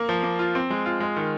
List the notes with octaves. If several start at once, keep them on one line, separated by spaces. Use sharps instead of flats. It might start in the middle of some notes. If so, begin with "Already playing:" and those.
Already playing: A#3
F3
A#3
F4
C4
G#3
F4
G#3
D#3